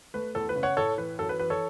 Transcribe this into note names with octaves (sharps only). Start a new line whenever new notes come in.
A3 B4
E2 A4
B4
C#3
C#5 F#5
A2 A4 C#5
E3 B4
F#2 A4
B4
E3 B4
A4 C#5